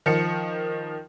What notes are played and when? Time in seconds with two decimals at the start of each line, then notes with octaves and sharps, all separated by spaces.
0.06 D#3 F3 C#7